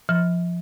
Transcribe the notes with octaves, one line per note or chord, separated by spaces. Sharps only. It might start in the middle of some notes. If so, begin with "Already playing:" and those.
F3